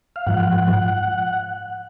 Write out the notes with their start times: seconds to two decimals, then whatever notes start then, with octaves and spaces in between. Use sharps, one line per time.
0.16 F5
0.27 G#2 F3 F#5